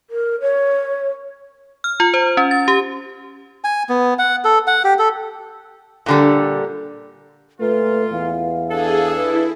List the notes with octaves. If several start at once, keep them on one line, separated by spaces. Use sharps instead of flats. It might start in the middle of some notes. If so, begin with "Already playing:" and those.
A#4
C#5
F6
F4
C5
C#4
A6
G4
G#5
B3
F#5
A4
F#5
G4
A4
A#2 D3 G3
A#2 A3 F4 B4
E2 F5
D4 G#4 A4
E4 B4